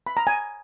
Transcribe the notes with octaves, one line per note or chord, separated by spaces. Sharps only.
B5
A#5
G#5